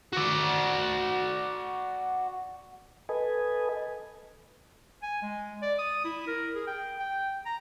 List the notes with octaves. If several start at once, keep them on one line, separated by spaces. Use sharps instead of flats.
F#4 D5
A4 B4 D#5 G#5
G#5
G#3
D5
D#6
E4
A#4
G#4
G5
G5
A#5